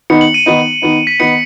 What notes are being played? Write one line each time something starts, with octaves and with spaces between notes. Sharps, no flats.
D#3 B3 D#4 C#7
F#7
D#7
D#3 B3 D#4
D#3 B3 D#4
B6
D#3 B3 D#4 C#7